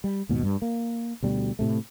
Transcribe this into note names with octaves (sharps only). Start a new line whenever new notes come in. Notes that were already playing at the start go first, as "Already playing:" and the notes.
G3
D#2 G#2 B2
G2 G3
A#3
D2 B2 G3
A2 C3 A3